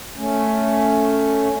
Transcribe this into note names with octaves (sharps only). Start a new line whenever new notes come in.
A3 C#4